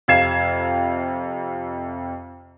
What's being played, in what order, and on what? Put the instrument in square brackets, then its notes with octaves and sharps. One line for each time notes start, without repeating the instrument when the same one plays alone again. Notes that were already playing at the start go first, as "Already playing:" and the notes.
[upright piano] F2 C3 F5 G#6 C7 E7